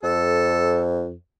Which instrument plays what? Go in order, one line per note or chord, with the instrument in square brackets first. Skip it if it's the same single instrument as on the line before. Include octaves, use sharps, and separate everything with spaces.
[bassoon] F2 [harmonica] A4